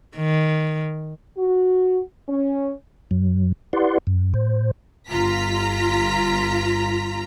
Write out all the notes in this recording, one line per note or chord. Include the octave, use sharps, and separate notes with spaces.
D#3
F#4
C#4
F#2 F#3
E4 G4 B4 D5 F#5 C6
F#2
A2 C5
G1 F4 A#5 B6